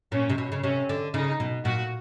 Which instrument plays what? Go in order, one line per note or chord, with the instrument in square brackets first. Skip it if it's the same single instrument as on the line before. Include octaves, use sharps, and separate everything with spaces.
[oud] A#2 [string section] C#4
[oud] C3
B2
C#3
[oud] C3 [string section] C#4
[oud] D3
[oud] C#3 [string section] D#4
[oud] B2
[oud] A#2 [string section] F#4